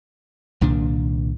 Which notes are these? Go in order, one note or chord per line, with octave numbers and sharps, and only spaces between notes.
C2 A#2 D#3 D4